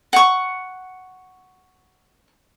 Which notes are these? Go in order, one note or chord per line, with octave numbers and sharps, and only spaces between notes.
F#5 C#6